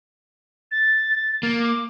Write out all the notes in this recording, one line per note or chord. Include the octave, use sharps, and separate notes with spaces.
A6
A#3
D6